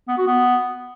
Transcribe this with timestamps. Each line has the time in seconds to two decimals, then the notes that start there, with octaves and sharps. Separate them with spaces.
0.08 B3
0.18 F#4
0.27 B3